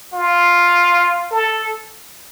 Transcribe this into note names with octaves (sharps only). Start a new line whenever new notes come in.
F4
A4